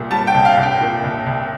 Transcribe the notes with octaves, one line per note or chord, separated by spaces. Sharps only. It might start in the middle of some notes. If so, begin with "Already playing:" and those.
Already playing: C2 A#2 G3
G3 A5
G5
C2
F5
C2
G5
A#2
C2
C2